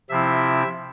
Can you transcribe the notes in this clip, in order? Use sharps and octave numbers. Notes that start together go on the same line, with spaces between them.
C3 F3 C4 E4 E5